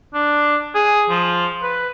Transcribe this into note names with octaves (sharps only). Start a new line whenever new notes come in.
D4
G#4
F3
B4